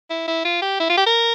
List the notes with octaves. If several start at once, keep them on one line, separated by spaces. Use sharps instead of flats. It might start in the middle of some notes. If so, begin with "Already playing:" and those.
E4
E4
F4
G4
E4
F4
G4
A#4